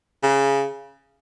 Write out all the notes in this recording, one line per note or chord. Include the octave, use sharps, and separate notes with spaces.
C#3